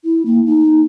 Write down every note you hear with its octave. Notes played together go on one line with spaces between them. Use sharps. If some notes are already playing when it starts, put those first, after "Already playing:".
E4
A#3
D#4